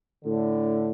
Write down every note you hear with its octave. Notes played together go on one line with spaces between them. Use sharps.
A2 D3